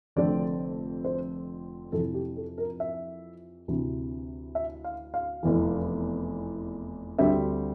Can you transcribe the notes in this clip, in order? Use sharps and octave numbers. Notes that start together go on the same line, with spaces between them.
F1 F2 D3 A3 C4 D5
C5
F2 C3 E3 A4
G4
A4
A#4
E5
D2 C3 E3
E5
F5
F5
F1 E2 E3
D2 D3 G3 C4 E5